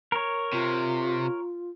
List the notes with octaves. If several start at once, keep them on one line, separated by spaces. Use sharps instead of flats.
A#4 C#5
C3 F4